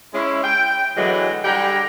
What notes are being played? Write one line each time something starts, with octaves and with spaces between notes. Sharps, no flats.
G#3 C#4 E4
G5
D3 E3 F#3 G#3 B3
D3 G3 G4 G5 G#5 A#5